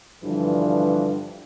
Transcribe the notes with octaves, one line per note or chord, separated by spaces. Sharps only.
G2 D3 E3 F3